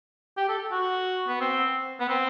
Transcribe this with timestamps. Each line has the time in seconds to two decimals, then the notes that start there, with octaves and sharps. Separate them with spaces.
0.37 G4
0.49 A4
0.71 F#4
1.28 B3
1.41 C4
2.00 B3
2.09 C4